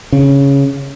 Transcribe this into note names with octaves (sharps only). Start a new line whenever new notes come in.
C#3